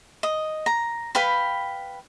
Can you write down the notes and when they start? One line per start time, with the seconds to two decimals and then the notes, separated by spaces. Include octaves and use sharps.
0.23 D#5
0.66 A#5
1.15 B4 F5 G5 B5